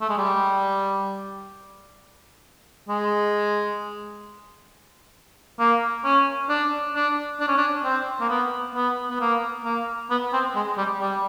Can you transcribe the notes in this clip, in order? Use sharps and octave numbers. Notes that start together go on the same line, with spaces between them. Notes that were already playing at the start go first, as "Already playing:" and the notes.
A3
G#3
G3
G#3
A#3
C#4
D4
D4
D4
C#4
D4
C4
A#3
B3
B3
B3
A#3
A#3
B3
C4
G#3
G3
G3